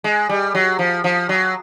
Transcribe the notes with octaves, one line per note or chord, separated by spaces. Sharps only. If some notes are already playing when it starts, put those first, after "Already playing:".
G#3
G3
F#3
F3
F3
F#3